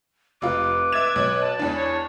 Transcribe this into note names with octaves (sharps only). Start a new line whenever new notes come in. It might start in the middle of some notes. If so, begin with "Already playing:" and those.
F1 F4 B4 D6
E5 G#6 A6 E7
B1
A5
E2 D4 E4
C#5